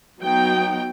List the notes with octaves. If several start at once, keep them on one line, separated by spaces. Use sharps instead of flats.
F#3 B3 D#4 G5